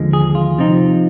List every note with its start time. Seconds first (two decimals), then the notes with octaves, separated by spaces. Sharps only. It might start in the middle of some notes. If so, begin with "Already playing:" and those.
Already playing: D#2 D3 F3 G#3
0.13 G#4
0.35 F4
0.58 C3 F3 C4 D#4